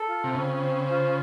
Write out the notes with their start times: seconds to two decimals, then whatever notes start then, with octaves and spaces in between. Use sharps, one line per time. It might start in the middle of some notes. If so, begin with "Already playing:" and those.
Already playing: A4
0.08 F4
0.24 C3
0.35 C#3 C4
0.63 C5
0.90 F4